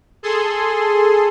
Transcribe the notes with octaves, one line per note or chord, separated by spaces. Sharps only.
G#4 A4 C6